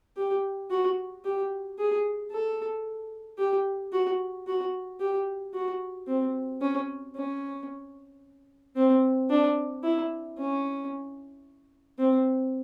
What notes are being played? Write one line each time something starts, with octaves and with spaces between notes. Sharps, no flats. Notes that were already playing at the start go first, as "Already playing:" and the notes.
G4
F#4
G4
G#4
A4
G4
F#4
F#4
G4
F#4
C4
C#4
C#4
C4
D4
E4
C#4
C4